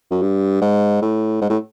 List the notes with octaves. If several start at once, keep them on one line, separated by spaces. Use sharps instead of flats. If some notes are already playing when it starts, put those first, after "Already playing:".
F#2
G2
G#2
A2
G#2
A2